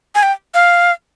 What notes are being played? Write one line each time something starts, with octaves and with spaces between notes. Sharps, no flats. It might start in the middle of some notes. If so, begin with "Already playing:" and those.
G#5
G5
F5